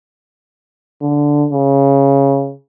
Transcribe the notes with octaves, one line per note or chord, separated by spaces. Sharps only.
D3
C#3